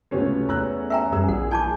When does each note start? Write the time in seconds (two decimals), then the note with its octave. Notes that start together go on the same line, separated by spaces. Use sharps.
0.11 C#2 C3 F#3 A3 B3 C#4
0.49 E2 A#5 E6 F#6
0.90 E5 G5 G#5 A#5 E6
1.12 F#2 G3 G#4 E6
1.28 A#1 E2 G#4 F#5
1.51 E4 G#5 A5 D6 G6 G#6